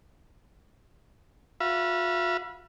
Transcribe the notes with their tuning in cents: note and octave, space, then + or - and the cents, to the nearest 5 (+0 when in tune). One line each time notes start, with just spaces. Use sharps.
F4 +45 E5 +35 B5 -25